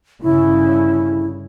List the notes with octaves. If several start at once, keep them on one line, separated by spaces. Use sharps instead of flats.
G1 C#3 E4